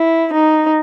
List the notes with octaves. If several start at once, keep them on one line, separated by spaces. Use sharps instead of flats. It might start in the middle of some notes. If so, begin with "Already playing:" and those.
Already playing: E4
D#4